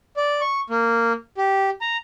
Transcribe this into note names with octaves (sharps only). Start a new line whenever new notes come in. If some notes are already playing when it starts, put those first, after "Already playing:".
D5
C#6
A#3
G4
A#5